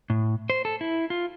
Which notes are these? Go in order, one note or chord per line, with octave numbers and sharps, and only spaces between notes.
A2
C5
A4
E4
F4